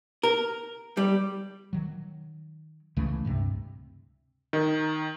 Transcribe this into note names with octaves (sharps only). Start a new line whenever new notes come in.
A#4
G3
D#3 F#3
C#2 C#3 E3 A3
C#2 G2 C3
D#3